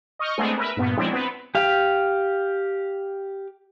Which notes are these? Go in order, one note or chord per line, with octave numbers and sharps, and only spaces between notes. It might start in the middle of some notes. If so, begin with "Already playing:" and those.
D#5 C#6 F6 G6
G#3 A3 B3 C4 D4 G#4
A#4 B4 E5
G2 A#2 B3
F3 F#3 G#3 C4 D4 E4
B3 C4 B4
G4 F5